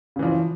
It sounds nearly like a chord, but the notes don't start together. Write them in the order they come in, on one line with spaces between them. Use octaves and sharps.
C#3 E3 F3